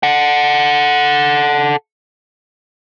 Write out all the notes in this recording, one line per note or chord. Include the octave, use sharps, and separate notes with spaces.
A4 F#5